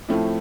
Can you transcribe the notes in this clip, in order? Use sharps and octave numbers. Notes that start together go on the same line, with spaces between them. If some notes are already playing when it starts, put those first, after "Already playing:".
A2 F3 A3 C4 E4